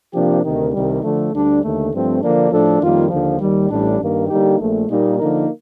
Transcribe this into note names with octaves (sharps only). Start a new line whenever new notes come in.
C3 F3 A#3 D4 G4
D2 C3 D#3
C2 C3 D#3 G3
D3 F3 A3
D2 D3 G3 D4
D#2 D3 A3
G2 F3 A3 C4
D3 F3 A#3 D4
A2 F3 A3 D4 A4
F2 D#3 G3 A#3 F4
D#2 D3 F3
D#2 D#3 G3
A1 A2 G3 D4
G2 D#3 A#3
D3 G3 A#3 D#4 G4
A#1 A#2 A3
A#2 G3 A#3 D#4
D3 F3 A#3 D#4 A#4